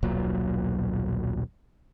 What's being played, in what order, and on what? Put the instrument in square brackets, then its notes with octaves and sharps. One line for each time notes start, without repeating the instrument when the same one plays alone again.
[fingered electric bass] D#1 B1 A#2 F#3